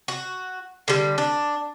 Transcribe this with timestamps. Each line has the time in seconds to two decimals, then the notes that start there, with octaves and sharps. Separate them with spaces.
0.08 F#4
0.88 D3 G3
1.18 D4